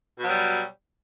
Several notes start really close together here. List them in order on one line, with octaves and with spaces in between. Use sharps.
B2 F#3 G3